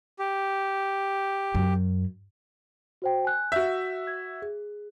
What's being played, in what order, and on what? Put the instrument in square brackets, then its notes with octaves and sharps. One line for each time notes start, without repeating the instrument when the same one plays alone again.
[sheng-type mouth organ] G4
[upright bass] F#2
[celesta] F#4 C5 G5
G#5 F#6
[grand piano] F#4 E5 [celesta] G6
[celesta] G#6
G#4